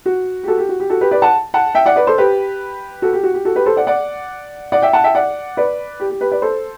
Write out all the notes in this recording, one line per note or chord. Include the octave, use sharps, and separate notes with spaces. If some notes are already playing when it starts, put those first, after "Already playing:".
F#4
G4
F#4 A4
G4
F#4
G4
F#4 A4
G4 B4
B4 D5
F#5 A5
F#5 A5
E5 G5
D5 F#5
B4 D5
A4 C5
G4 B4
F#4 A4
G4
F#4
G4
F#4 A4
G4 B4
A4 C5
D5 F#5
D5 F#5
D5 F#5
E5 G5
F#5 A5
E5 G5
D5 F#5
B4 D5
G4
G4
G4 B4
B4 D5
A4 C5